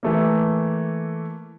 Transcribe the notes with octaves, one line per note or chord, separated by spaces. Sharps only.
E3 A3 A#3